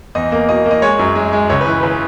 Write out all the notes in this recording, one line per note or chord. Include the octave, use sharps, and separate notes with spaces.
E2 D#5
A#3
B2 D#5
A#3
D#5
G#3 C#5
F#2
G#3
G#3
C#2 C#5
B4
E3
C#3 B4